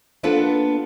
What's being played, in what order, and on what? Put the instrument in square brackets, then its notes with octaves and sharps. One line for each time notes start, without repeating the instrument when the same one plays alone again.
[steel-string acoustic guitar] A#3 B3 D4 F4 A4 B4